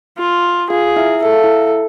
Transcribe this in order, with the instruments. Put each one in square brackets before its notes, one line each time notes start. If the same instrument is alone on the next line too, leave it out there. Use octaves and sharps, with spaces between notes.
[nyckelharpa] F4
[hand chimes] F4 F5 [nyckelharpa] G#4
[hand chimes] E4 E5
[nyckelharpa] A4 [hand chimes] E5
[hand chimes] F5
E4 E5